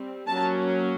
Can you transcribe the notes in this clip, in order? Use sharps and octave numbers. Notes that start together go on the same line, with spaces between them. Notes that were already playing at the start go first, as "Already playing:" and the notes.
Already playing: G3 C4
F#3 A#3 C#4 A5